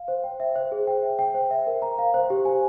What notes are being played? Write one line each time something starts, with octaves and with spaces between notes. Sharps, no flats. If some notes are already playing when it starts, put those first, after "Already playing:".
Already playing: F5
C5
G5
E5
C5
G#4
G5
E5
G5
C5
E5
A#4
A#5
F5
C5
G4
G#5